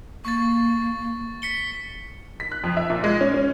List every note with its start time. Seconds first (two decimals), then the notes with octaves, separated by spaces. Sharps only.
0.25 A#3 C#6 A6
1.42 B6 C#7 G7
2.40 B6
2.52 F#6
2.64 F2
2.77 E5
2.90 A#2
3.04 G#3
3.21 C#4
3.34 C#4